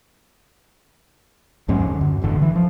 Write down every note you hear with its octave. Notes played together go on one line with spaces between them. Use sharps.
D#2 G#2 F#3 C#4
D3
F#2
E1 A1 D3
E3
F3